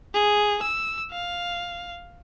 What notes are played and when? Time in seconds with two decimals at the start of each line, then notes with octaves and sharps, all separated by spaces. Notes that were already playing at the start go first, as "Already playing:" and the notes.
0.14 G#4
0.62 E6
1.11 F5